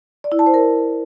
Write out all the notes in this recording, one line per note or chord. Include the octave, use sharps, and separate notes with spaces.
D5
E4
A5
C5
A#4